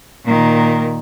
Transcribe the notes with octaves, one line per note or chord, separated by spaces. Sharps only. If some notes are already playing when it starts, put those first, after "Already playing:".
A#2 D#3